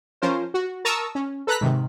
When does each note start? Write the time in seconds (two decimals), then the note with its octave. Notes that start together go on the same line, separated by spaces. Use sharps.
0.22 F3 C#4 F4 A#4 C5
0.54 F#4
0.85 A#4 A5 A#5 C#6 D#6 E6
1.15 C#4
1.47 A4 B4 A#5 F#6 B6
1.61 G#2 C3 D#3